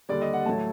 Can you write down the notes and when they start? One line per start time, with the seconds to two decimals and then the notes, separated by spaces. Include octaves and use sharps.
0.09 D#2 D3 G3 D5
0.22 D#5
0.33 F#5
0.46 A2 F#3 A3 A5